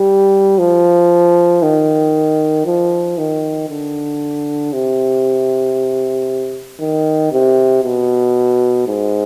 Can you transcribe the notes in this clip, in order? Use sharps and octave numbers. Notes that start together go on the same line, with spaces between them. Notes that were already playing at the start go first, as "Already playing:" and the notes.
Already playing: G3
F3
D#3
F3
D#3
D3
C3
D#3
C3
B2
G#2